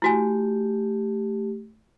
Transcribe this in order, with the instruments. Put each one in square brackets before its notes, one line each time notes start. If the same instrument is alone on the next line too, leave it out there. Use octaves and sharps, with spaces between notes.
[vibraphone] A3 G4 [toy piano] E4 F#4 G#5